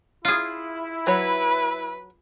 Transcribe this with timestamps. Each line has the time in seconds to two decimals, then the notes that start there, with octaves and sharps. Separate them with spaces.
0.25 E4 F4 G#4
1.07 F#3 B4 C#5